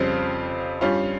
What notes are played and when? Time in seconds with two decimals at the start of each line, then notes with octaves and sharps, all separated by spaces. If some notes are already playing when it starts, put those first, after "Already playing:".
Already playing: F2 C#3 G3 C4 F4
0.81 G2 G3 C#4 F4